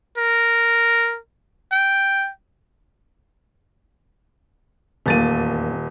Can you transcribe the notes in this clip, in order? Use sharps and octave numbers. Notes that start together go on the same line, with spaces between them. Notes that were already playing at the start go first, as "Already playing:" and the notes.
A#4
G5
D#1 E2 A3 A#3 A6 D#7